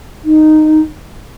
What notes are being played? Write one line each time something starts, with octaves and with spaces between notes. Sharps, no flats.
D#4